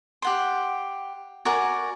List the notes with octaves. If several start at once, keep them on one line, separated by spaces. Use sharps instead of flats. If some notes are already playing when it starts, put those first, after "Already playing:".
G4 F#5 C6
F#4 A#4 D5 G#5